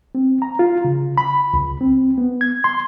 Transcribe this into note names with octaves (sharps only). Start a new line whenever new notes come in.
C4
A#5
F4
C#3
B5
C#2
C4
B3
G#6
C6